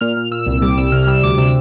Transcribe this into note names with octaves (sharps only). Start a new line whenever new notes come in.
A#2 F6
A#2
A#2 E6
C2
G3 D6
C2 E6
C3 F6
G3 E6
D2 D6
C3 E6